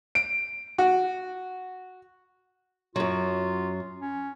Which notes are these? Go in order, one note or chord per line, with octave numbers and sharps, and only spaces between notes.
D7
F#4
F#2 F#3 F4
C#4